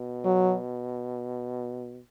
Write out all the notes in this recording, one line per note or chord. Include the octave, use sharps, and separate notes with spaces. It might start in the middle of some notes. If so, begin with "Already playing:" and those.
Already playing: B2
F#3